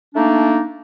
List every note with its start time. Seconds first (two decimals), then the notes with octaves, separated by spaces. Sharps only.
0.15 A3 A#3 D4 D#4